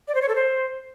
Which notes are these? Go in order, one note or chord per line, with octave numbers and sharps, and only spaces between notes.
D5
C5
C#5
A4
C5